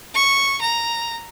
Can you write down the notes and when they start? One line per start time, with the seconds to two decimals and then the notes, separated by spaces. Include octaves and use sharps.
0.15 C#6
0.61 A#5